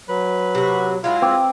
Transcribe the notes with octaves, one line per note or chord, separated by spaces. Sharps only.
F#3 B4
C3 F#4
F#3 G#3 E4 F4
C4 D6